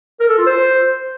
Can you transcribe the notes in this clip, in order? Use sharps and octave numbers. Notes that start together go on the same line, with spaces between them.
A#4
A4
F4
C5